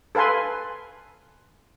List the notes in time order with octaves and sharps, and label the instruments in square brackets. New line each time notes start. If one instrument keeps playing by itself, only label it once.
[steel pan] A4 B4 F5 G#5 C6